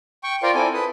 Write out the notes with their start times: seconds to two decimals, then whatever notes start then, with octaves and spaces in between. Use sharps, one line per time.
0.24 G5 C#6
0.43 F4 A#4 C5 D5 F5 G5
0.55 C4 E4 A4 G#5
0.74 B4 D#6